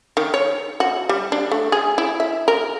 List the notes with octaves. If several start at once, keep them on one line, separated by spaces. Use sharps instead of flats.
D#3
C#5
F#4
G3
D4
A3
G#4
E4
E5
A#4